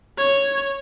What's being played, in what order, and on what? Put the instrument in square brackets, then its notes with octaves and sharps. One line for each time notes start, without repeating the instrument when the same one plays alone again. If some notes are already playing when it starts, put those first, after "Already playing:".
[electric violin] C#5